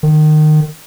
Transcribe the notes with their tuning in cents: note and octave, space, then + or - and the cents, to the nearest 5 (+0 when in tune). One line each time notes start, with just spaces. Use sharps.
D#3 -25